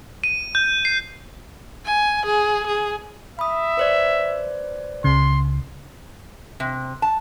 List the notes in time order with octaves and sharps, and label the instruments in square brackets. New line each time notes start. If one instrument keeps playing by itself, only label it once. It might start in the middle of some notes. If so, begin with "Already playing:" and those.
[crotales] D#7
G6
C7
[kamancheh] G#5
G#4
G#4
[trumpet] E5 [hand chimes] B5 D#6
[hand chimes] B4 C5 D5
[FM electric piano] C#2 C#3 [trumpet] C6
[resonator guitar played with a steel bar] C3
A5